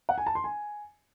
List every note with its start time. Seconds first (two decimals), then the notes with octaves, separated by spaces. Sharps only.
0.09 F#5
0.18 G#5
0.26 A5
0.35 C6
0.44 G#5